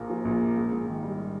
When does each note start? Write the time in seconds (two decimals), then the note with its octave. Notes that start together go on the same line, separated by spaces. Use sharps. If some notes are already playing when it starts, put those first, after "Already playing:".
Already playing: A#1 A#2 A#3
0.10 F3
0.25 A#1
0.40 A#3
0.56 G#2
0.72 G#2
0.87 D#3
1.03 G3